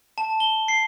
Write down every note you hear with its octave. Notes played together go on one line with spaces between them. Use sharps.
A5
G7
C7